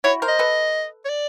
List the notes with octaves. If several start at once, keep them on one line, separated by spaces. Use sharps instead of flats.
E4 F#4 C#5
A#4 C5
D#5
A4 B4
C#5
D5